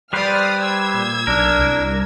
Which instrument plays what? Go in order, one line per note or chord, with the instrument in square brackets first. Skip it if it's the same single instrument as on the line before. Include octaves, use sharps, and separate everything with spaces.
[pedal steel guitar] G3 B4 C5 [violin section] D5 D#6 F6
[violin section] E6 G#6
[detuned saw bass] A#2
[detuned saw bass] B1 [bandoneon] D4 [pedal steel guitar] A#4
[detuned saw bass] C2